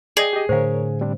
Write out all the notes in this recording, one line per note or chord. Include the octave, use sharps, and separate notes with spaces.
G#4 D5 D#5 G5
G4 D#5
A2 D3 A#4 C5 C#5 F5
G3 C4 D4